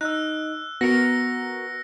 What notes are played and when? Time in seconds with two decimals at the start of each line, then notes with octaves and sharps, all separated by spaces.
0.01 D#4 E6 F#6
0.81 B3 F#4 A#4 A#6 C#7